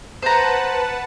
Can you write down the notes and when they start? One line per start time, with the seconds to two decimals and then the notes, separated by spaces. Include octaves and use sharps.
0.22 B4 C5 F#5 A5 A#5